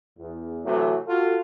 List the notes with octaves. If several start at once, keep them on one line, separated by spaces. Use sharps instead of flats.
E2
C3 E3 F#3 A3
F4 F#4 A4